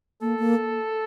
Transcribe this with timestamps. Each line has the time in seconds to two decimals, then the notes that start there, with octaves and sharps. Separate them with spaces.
0.21 A#3 A4
0.39 A#3